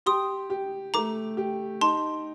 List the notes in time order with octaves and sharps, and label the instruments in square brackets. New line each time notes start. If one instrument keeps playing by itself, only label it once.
[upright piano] G4 [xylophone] C6 D#6
[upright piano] G4
[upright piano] A3 [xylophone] A#5 D6
[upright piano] G4
[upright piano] D#4 [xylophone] A5 C6